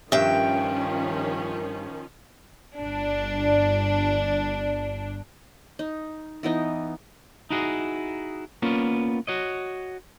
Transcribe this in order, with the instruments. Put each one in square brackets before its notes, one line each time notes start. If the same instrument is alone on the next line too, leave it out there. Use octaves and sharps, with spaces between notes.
[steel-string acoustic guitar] G2 G5 [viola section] D#3 F3 C#4 [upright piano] E5
[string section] G1 D4
[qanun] D#4
E3 B3 D#4 D#5
[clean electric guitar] D#4 E4 F#4 G#4
A#3 B3 C#4 F4
F#4 C#5 D#5